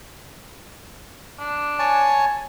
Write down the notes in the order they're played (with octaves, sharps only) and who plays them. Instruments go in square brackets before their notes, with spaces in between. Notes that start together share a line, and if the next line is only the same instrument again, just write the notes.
[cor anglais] D4
[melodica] C#5 G#5 A5